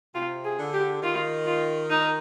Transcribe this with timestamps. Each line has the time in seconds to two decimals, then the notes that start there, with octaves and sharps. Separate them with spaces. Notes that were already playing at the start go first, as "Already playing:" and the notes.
0.15 C3 F4
0.45 G#4
0.58 D3
0.74 G4
1.02 D#3 F4
1.46 F4
1.90 D#4